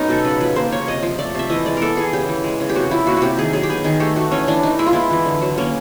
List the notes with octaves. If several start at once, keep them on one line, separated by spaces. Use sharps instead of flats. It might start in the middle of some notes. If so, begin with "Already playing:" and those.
Already playing: F#3 A3 B3 C#4 D#4
B2 A4
C#3 B4
F3 B4
A#3 C5
C#3 C#5
C3 D#5
F3
A3 D5
C3 E5
E3 D#5
G#3 D5
B3 A4 A#4
E3 G#4
C#3 G4
E3
G#3
C#3
G4
C3 F#4
F3 E4
A#3 F#4
C3 F#4 G4
D#3 G#4
F#3 G#4
G4
B3 G#4
D#3 G#4
A3 G4
A3 F#4
E3 C#4
E3 D4
E3 D#4
G#3 E4
F4
B3 E4
E3
D3
F#3
A#3 C#4